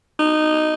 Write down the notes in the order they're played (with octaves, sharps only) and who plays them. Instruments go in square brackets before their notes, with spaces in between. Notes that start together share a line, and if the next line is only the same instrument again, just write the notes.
[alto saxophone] D#4